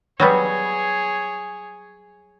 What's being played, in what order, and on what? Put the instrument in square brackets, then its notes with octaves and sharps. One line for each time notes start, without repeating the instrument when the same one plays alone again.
[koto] F#3 G3 B3 [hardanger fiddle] G#4 C#5